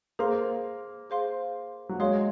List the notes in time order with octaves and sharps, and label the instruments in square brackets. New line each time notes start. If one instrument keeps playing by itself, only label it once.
[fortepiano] A#3 [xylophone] G#4 C5 F5 C6
[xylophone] G#4 C5 F5 C6
[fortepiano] F#3
[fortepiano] G#3 [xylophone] C#5 F5 C6